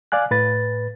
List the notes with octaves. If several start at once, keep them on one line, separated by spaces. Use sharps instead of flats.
D5 F5 G#5 F#6
A2 B4 A6